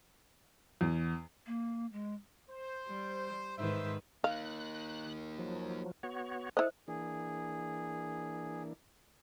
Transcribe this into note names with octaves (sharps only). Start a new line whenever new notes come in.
E2
A#3
G#3
C5
G3
G#2 D#3 B4 C5 E5
A#3 D#4 F5 F#6
F3 F#3
B3 F#4 C#5
E4 A4 C5 D#5
E3 A#3 D4 G#4